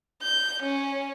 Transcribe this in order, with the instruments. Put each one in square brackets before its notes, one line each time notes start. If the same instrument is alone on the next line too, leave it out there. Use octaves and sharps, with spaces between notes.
[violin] G6
C#4